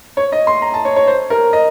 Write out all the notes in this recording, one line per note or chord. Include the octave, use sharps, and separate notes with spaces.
C#5
D#5
C6
A#5
A5
C#5
C#5
C5
A#4
D#5